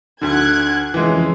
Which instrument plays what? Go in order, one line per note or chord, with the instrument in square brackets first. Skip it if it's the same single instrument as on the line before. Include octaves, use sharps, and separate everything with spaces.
[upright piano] D2 D3 [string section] F#6 G#6
[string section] F2 C#3 [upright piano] E3 G#3